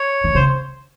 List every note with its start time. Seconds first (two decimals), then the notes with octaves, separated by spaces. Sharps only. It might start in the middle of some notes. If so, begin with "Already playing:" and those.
Already playing: C#5
0.24 D#3
0.35 C#3 C5